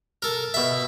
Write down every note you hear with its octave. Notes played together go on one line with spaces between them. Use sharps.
A4 A#4
B2 E5